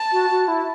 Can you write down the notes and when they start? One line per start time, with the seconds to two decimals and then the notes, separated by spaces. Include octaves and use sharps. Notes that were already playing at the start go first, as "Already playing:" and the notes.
Already playing: A5
0.12 F#4
0.30 F#4
0.48 E4